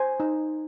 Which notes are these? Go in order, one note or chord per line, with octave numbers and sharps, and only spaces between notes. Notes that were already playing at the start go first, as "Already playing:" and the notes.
Already playing: C5 G#5
D#4